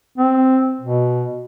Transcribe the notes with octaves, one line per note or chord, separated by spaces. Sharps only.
C4
B2